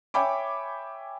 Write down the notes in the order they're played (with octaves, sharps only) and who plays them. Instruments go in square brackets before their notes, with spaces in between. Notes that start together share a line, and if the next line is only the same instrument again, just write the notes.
[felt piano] C#5 E5 G5 G#5 B5 D6